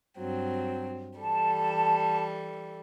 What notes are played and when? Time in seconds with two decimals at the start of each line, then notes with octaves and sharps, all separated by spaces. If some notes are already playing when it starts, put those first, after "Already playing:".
0.18 G2 F#3 C4
1.18 E3 G3 A4 A5